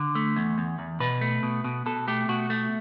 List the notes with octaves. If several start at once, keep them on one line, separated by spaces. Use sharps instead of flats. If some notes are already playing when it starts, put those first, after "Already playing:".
Already playing: D3
A3
E2
E2
E2
B2 B4
A3
B2
B2
B2 A4
A3 G4
B2 F#4
A3